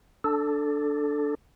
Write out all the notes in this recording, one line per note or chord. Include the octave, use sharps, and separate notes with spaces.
D4 A4